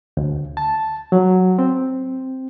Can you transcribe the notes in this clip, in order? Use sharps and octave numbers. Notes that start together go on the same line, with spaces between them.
D2
A5
F#3
C4